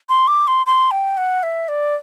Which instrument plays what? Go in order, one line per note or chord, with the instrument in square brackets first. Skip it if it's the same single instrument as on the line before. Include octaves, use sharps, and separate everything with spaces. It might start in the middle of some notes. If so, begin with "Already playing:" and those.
[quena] C6
D6
C6
C6
G5
F#5
E5
D5